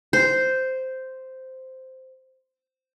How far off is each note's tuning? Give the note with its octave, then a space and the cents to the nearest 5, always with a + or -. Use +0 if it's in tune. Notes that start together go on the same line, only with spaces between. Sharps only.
C5 -5